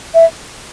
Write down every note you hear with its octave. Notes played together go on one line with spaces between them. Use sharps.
E5